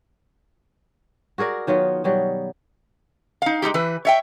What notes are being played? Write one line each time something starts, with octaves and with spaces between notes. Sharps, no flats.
F#4 G#4 A#4 D5
D#3 F#3 B3 F4
B2 F#3 G3
D#4 F5
G#3 D#4 E4 G4
E3 B4
C#5 E5 G5